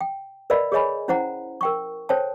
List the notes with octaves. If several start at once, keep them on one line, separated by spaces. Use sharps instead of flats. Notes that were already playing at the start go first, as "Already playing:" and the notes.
G5
A#4 B4 D5 D#5 F5 B5
G#4 A4 C#5 D#5 G#5 B5
C#4 E4 C5 F#5 A#5
A#4 G5 C#6
A4 C5 C#5 G5 A5